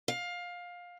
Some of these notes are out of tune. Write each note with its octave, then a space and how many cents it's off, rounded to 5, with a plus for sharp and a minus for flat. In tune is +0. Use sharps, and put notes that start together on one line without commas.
F5 +20